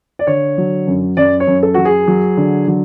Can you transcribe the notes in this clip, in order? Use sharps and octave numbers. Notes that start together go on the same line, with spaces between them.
D5
D3 C#5
F#3
F#2
F#2 D5
C#5
F#2
A4
F#3 F#4
G#4
F#3
D3
F#3